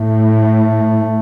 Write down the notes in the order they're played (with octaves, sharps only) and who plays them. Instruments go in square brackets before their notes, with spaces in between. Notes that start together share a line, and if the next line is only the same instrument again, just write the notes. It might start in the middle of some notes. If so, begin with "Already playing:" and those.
Already playing: [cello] A2 [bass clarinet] A3